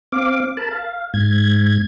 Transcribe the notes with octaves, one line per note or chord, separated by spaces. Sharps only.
C4 F5 D6
A#4 A5 B5
F5
G#2 G#6